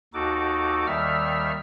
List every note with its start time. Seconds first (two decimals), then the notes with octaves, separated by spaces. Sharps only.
0.14 D#2 D#4 F#4 A4 D6
0.86 D#2 D#3 G3 E5 E6 F6